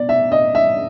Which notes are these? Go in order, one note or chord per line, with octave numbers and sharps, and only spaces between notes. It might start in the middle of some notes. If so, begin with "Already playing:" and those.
Already playing: B2 D5
E5
D#5
E5